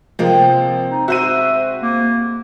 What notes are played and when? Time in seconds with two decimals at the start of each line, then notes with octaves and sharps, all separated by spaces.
0.19 C3 F3 G#3 A#3
0.91 D#4
1.08 F#4 C5 E5 D#7
1.83 A#3